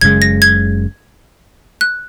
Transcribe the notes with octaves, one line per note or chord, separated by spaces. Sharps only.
F#1 F#2 C#3 G#3 G#6
A#6
G#6
F#6